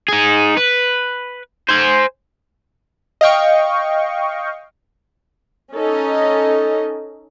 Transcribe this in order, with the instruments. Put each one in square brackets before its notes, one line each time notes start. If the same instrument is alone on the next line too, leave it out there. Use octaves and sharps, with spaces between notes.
[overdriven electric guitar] D#4 G#4
B4
C5 G#5
[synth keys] D#5 F5 G5 C#6
[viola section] C#4 D#4 A4 D#5